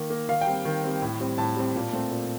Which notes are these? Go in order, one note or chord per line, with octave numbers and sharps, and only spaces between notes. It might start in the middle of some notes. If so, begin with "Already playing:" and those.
Already playing: D#3 A#3
A#3
D#3 F5
G5
G3 C4
D#3
G3 C4
A2
G3 C4
A2 A5
G3 C4
A#2
A3 C4
A#2